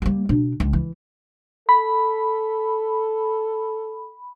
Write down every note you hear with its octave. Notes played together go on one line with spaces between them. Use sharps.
G3 A#3
B2 D4
C#2
E3
A4 B5